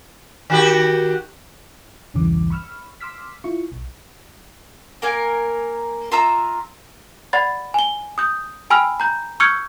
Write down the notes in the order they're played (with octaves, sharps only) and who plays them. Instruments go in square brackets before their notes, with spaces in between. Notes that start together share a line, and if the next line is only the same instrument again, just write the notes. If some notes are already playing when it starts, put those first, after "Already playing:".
[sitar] D#3 F#4 G4
[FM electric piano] B1 E2 G2 C#3 E3 D6
B5 C#6 E6 F6
C6 D6 E6 F6 B6
E4 F4 C#6
B1
[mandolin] A#3 A#4 G#5
F4 E5 A#5 E6
[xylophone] D5 F#5 B5 A6
G#5 G7
D#6 G6
G5 G#5 B5 E6 F6
A#5 G6
C#6 E6 F6 G6 G#6 C#7